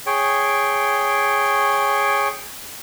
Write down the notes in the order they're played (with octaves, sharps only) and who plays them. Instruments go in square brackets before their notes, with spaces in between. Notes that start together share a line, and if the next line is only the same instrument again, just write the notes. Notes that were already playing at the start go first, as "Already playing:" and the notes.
[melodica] G#4 C#5 G5